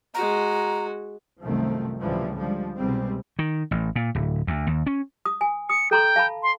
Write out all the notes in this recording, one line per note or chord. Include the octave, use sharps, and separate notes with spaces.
G#3 F#4 A#5
C2 F#2 D#3 F3 A3 C4
C#2 A2 C3 E3 F3 G3
D3 F3 G3 G#3
C2 B2 G3 G#3 C4
D#3
A1
A#2
D1
D2
D#2
C#4
D#6
G#5
D#6 C#7
A4 G5 A#5 C6
F5 A5 B5
C6